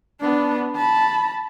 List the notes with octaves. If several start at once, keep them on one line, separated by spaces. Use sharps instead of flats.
B3 D4
A5 B5